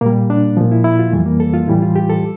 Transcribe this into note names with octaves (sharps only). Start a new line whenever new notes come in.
A#2 G3 A#3
D4
A#2 F3
E4
E4
F4
F2 E3 G3 A3
A#3
A4
F4
A2 E3 G3 E4
F4
G4
A4